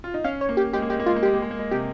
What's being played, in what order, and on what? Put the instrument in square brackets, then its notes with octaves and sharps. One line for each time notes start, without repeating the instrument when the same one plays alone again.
[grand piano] F4
D#4
[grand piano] C#4 [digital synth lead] F5
[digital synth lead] C#5
[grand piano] A#3
[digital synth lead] G4
[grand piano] G#3 [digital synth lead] G4
[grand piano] A#3
[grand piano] G#3 [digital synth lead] G4
[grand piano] A#3
[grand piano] G#3 [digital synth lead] F4
[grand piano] A#3
[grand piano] G#3 [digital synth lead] G4
[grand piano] A#3
G#3
A#3
G#3
[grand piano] C3 [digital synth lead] G4